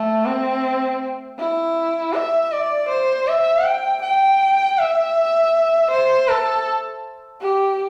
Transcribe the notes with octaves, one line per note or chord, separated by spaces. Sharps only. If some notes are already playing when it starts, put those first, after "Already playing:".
Already playing: A3
C4
E4
E5
D5
C5
E5
G5
G5
E5
C5
A4
G4